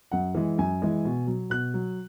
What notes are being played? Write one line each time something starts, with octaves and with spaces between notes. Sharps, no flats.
F#2 F#5
E3 G#3
F#2 G#5
E3 G#3
B2
F#3
B2 F#6
F#3